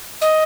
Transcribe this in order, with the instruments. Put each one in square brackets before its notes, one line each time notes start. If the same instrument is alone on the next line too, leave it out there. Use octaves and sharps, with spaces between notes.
[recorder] D#5